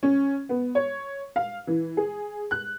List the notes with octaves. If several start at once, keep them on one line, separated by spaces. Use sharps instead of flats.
C#4
B3
C#5
F5
E3
G#4
F#6